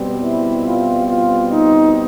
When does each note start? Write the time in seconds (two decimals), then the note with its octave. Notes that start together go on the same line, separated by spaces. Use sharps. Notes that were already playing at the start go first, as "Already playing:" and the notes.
Already playing: B2 G3 C4
0.22 E4
0.64 F4
1.06 F4
1.50 D#4